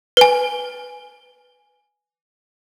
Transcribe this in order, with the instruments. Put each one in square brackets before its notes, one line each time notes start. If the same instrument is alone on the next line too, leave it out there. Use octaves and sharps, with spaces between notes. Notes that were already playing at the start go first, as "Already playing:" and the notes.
[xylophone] B4 G#5